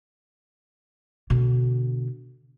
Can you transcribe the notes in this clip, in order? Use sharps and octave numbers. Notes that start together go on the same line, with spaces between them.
B2 D3